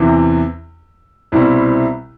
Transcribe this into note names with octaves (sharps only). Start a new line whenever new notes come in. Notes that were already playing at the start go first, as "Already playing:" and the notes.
Already playing: E2 C3 E3
C2 B2 G3 C4 E4